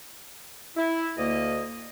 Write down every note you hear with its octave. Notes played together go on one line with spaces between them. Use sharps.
E4
D2 A#3 D#5